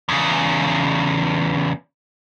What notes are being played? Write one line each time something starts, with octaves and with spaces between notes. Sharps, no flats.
E2 C#3